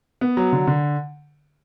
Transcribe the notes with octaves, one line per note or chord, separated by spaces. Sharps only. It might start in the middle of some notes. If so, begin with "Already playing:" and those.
B3
F#3
D3
D3